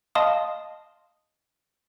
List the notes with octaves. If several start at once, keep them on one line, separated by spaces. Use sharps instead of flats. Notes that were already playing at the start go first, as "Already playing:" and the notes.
D#5 F5 A5 C6 D#6